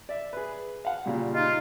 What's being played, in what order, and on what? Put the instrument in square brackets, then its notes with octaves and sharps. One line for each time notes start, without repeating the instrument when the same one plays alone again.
[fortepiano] D5 E5
G#4 B4
F5 F#5
A#2 C#3 G3
[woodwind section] D#4 F4